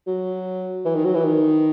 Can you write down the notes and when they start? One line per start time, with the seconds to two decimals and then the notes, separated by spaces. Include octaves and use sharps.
0.07 F#3
0.85 E3
0.95 D#3
1.05 F#3
1.15 E3
1.25 D#3